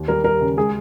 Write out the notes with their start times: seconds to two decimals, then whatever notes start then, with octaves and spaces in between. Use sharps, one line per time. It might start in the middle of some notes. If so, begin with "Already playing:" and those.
Already playing: D#2
0.08 G3 A#4
0.24 G3 A#4
0.41 C#3
0.57 G#3 G#4